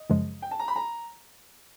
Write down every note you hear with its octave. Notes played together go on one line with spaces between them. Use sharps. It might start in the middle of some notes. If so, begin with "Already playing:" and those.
Already playing: D#5
F#2 C#3 F3 G#3
G5
A5
A#5
B5
A#5